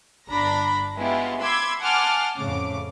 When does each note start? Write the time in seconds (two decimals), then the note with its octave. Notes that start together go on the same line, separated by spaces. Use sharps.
0.29 G1 D4 A#5 B5 A#6
0.97 G#3 B3 E4 F4 G4
1.40 B5 C6 D6 E6 G#6
1.81 F#5 G#5 A5 C6 D6 F6
2.38 F2 A2 C#3 D6